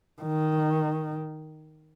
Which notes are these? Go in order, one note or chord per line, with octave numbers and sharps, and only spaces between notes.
D#3